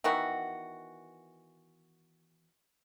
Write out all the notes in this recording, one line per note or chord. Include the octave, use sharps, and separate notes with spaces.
D#3 E3 B3 F#4